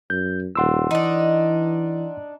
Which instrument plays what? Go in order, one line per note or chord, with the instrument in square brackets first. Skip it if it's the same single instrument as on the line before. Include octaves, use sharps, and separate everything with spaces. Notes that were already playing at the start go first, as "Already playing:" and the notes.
[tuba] F#2 [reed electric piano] G6
[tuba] D#1 [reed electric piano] F#5 C6 E6
[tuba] E3 [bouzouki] D4 D#4